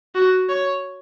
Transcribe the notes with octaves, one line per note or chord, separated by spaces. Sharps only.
F#4
C#5